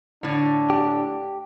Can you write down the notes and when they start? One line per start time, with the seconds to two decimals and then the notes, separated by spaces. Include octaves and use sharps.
0.23 A2 D3 D4
0.70 G4